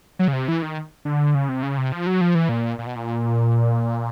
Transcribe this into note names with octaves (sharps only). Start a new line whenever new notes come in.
F#3
C#3
C3
E3
D#3
D3
C#3
C3
C#3
C3
F3
F#3
F3
E3
A#2
A#2
B2
A#2